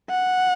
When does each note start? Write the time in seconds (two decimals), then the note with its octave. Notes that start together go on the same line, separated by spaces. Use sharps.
0.10 F#5